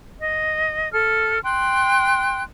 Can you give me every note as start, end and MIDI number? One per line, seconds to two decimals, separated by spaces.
0.20 0.91 75
0.92 1.39 69
0.92 1.39 89
1.43 2.42 79
1.43 2.42 84
1.43 2.42 90